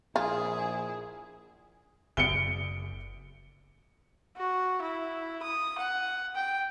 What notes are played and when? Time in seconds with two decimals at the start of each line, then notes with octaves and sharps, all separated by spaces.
0.16 A#1 E4 F4 G#4
2.17 F#1 C#7 D7 G7
4.37 F#4
4.82 E4
5.42 D#6
5.78 F#5
6.35 G5